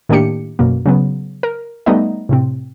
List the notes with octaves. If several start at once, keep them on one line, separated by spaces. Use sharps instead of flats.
A2 D#3 A#3 D4 G4 C#7
F#2 B2 A#3
C#3 F#3 B3
A#4
G3 A3 B3 D#4 D#5
A2 C3 C4